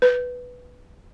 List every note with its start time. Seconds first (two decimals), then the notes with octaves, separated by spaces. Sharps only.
0.02 B4